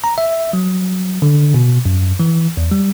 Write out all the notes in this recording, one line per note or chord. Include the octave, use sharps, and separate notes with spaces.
A#5
E5
F#3
D3
B2
F#2
E3
E2
G3